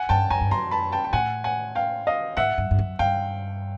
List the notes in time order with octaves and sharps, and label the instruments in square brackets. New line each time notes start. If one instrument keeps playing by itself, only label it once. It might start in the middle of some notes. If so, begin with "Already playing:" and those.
Already playing: [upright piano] F#5 G#5
[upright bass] G2 [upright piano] G5 A5
[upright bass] F#2 [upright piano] G#5 A#5
[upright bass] G2
[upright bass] F#2 [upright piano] A#5 C6
[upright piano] A5 B5
G5 A5
G5
[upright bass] A2 [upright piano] F#5 G#5
[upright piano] F#5 G#5
F5 G5
D#5 F5
[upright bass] G#2 [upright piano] E5 F#5
[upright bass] G2
G2
F#2
[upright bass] G2 [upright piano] F5 G5